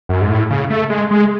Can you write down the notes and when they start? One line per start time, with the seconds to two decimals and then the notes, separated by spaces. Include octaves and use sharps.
0.09 F#2
0.21 G#2
0.30 A2
0.50 C#3
0.70 A3
0.90 G#3
1.11 G#3